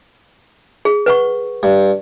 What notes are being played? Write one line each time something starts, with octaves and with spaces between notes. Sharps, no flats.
G#4
B4 F#5 C#6
G2